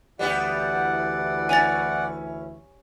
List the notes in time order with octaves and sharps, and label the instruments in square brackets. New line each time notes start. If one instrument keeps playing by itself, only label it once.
[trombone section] D2 E3 E4 [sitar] G3 B3 G4 [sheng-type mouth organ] D5 F#5
[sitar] C#4 [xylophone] G#5 A6